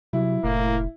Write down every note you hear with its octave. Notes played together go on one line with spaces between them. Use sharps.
C3 F#3 E4
F1 A2 A#3